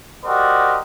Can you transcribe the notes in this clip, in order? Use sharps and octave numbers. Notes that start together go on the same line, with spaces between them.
F#4 G4 A#4 C5 D5 D#5